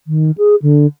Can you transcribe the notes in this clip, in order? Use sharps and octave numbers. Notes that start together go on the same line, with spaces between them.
D#3
G#4
D3